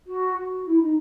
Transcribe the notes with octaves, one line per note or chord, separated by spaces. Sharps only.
F#4
F#4
E4
D#4